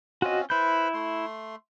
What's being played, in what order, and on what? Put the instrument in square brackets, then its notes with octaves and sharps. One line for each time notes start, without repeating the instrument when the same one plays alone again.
[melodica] C4 C#4 F4 [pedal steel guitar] F#4 D#5
[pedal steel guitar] E4 G6 [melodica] B4 C5 B5
[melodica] A3 C6